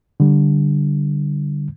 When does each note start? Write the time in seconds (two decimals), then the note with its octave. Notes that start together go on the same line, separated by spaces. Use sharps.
0.20 D3 G3